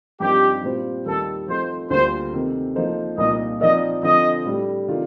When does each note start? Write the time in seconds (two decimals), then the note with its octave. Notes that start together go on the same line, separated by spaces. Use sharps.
0.20 G2 F3 C4 D#4 G4 A#4
0.63 A#2 G3 C4 F4 C5
1.06 D#2 D#3 G3 A4
1.48 F3 A3 C4 D#4 C5
1.90 D2 D3 G3 A#3 F4 C5
2.33 C3 D#3 A3 C4
2.75 F3 A#3 D#4 A4 C5
3.18 C2 A#2 F3 A#3 D#4 D#5
3.61 F3 C4 D#4 A#4 D5 D#5
4.03 D3 F3 C4 D#5
4.45 A2 G3 D4 G4
4.88 C3 D#3 A3 D4 F4